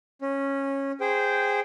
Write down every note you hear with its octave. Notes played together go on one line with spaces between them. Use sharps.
C#4
G#4 C5 G5